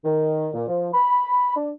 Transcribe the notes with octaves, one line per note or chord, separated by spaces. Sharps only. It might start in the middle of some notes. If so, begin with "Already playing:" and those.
D#3
A#2
F3
B5
D4